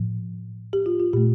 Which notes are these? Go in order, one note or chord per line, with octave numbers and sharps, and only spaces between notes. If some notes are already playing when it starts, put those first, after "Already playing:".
Already playing: A2 F3
G4
F4
F4
A#2 A3 G4